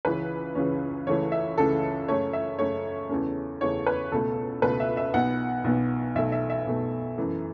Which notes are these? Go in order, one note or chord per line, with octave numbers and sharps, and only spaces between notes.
C#2 C#3 E3 C#4 B4
C#2 C#3 E3 C#4
C#2 C#3 E3 A3 C#5
E5
C#2 C#3 E3 A3 A4
F#2 C#3 A3 C#4 C#5
E5
F#2 C#3 A3 C#4 C#5
E2 C#3 A3 C#4
E2 C#3 A3 C#4 C#5
B4
C#2 B2 A3 A4
C#2 B2 A3 B4
E5
E5
B1 B2 B3 F#5
B1 B2 B3
B1 B2 A3 E5
E5
E5
B1 B2 A3
F#2 E3 A3